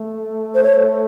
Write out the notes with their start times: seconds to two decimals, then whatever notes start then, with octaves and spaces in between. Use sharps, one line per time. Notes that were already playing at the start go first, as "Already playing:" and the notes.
Already playing: A3
0.55 C5
0.63 C#5